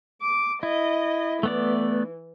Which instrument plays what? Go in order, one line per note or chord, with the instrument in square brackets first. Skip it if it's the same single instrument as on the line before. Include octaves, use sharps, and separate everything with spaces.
[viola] D6
[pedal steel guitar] E4 [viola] D#5
[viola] E3 [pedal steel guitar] A3 B3 D5